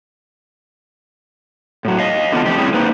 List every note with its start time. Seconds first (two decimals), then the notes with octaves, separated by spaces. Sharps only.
1.85 A2 F#3
1.99 D#5 F5
2.32 D3 E3 B3 F4 A4
2.45 F2 A3 G4
2.58 G3 A3 C4 C#4 E4 G#4
2.74 A#3 D#4 B4 C5